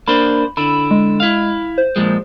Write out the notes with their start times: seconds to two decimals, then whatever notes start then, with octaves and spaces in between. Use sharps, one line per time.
0.08 A#3 D4 C5 B5
0.57 D3 E4 B5
0.91 G#3
1.20 E4 F5
1.78 C5
1.96 A#2 F3 G#3